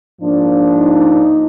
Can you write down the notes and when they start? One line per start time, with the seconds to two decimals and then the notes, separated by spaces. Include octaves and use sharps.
0.21 G#2 F3 A#3 D4
0.76 D#4